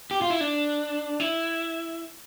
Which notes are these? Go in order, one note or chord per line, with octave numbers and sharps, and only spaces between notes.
G4
F4
E4
D4
E4